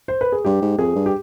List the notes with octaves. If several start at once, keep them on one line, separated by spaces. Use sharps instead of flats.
C5
B4
G#4
G2 G4
G#2
F2 G#4
G2
G4